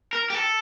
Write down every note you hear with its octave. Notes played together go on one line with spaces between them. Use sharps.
A#4
G4
A4